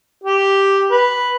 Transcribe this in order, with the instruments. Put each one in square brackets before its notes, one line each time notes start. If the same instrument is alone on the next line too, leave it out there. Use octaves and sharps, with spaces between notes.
[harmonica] G4
B4